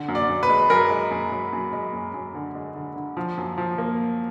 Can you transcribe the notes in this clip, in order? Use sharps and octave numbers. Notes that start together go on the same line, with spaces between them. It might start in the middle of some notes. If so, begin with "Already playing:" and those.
Already playing: D3
F#2
D5
F#2
B4
G#3
F#2 A#4
G#3
F#2
F#2
F#2
G#3
F#2
F#2
D3
G#3
D3
D3
F3
F#2
F3
A#3